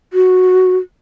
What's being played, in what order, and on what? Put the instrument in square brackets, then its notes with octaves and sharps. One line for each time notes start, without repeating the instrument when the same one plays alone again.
[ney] F#4